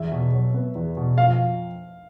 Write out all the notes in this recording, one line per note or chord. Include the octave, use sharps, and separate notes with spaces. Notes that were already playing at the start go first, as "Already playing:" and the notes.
Already playing: E2 E5
B2
F#3
B3
E2
B2
F2 F5